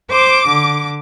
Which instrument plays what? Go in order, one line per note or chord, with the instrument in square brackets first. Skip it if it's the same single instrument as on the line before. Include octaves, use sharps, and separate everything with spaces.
[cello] C5 [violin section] D6
[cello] D3